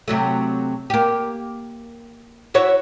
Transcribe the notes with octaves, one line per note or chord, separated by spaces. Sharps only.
C3 F#3 A3
A#3 G4
E4 F#4 C#5